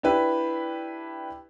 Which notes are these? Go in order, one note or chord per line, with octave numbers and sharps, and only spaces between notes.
D4 E4 G4 B4